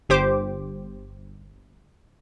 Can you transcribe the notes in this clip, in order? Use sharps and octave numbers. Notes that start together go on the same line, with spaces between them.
G1 G4 C5 D6